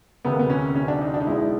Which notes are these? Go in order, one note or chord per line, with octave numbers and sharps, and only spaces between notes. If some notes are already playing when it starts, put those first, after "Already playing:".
E1 D2 C3 B3
A#3
B3
C#4
C#4
D4
D#4
D4
D#4
B1 B2 G#3 E4